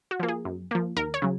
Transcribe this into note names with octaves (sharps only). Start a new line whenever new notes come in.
F#4
F3 A#3
G#4
F#2
F3 A#3
D#2 A#4
C#5
C#3 F#3